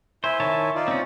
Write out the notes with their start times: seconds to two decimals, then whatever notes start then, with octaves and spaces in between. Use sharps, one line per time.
0.24 E4 C5 E5 G#5
0.40 D#3 C#5 A5
0.75 D#4 F4 D5
0.88 C4 C#4